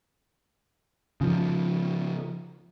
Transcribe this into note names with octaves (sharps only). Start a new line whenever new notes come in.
C#3 F3